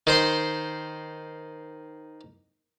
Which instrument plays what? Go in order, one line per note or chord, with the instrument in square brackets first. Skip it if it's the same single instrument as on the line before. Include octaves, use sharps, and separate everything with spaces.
[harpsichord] D#3 C5 C6